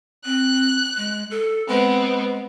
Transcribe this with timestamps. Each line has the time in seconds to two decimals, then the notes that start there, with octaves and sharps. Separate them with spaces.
0.25 C4 F#6
0.96 G#3
1.31 A4
1.68 G#3 B3 C4